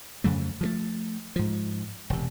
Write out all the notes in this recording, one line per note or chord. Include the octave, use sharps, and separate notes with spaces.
F2 C#3 F#3 A3
F3 F#3 A3
G#2 F3
E1 C3